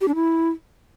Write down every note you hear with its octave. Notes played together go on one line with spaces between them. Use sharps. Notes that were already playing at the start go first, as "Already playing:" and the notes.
G4
D4
E4